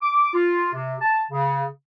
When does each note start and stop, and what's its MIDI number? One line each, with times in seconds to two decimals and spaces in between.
0.01 0.32 86
0.33 0.68 65
0.73 0.95 48
1.01 1.22 81
1.31 1.66 49